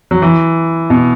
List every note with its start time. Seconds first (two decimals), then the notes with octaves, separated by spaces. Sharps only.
0.11 F#3
0.22 E3
0.90 B2